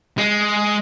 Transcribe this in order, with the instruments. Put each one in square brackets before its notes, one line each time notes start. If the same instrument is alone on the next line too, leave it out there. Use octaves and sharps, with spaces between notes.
[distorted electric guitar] G#3